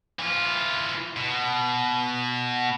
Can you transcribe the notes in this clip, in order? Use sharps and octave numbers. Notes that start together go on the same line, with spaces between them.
E3 F4
B2